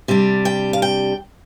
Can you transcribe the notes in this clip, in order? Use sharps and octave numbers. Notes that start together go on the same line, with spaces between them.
C3 G3 D4
G5
F5
G5